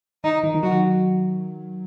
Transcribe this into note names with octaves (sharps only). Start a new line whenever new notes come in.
D#3 D#4
D#3
D#3
F#3 F#4